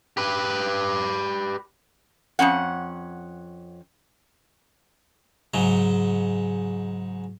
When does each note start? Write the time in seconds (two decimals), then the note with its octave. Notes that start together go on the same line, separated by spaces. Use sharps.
0.17 G4 B4
2.39 F2 G#3 C#4 F#5
5.54 G#2 C#3 F#3